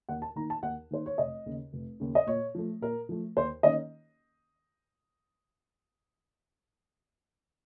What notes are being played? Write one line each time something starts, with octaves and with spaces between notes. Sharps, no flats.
D#2 F#5
A5
D#3 A#3 D#4 A#5
A5
D#2 F#5
D#3 A#3 D#4 C5
C#5
F1 D#5
D#2 C#3
F1
D#2 C#3
D#5
A#2 C#5
F3 A3
A#2 A#4
F3 A3
D#2 C5
D#3 A#3 C#4 D#5